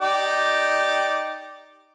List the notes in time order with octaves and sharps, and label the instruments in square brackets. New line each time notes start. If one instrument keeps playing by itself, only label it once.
[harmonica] D#4 G4 D5